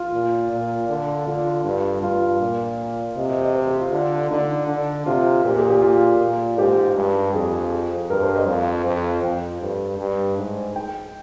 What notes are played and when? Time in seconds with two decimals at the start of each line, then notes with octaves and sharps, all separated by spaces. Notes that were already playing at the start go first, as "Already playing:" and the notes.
Already playing: F4
0.13 A#2
0.51 A#2
0.89 D3
1.27 D3 F4
1.65 G2
2.02 G2 F4
2.40 A#2
3.16 C3 D#5
3.30 D#5
3.42 D#5
3.54 C5
3.67 G4
3.80 F4
3.92 D3
4.31 D3 D#4
4.68 D3
5.06 C3 F4
5.44 A#2 G4
5.57 G#4
5.69 G4
5.82 F4
6.21 A#2
6.58 G#2 G4
6.96 G2
7.34 F2 G#4
8.10 G2 A#4
8.23 C5
8.35 D#5
8.48 F2 F5
8.86 F2
9.23 F2 G5
9.62 G2
9.99 G2
10.38 G#2
10.76 G5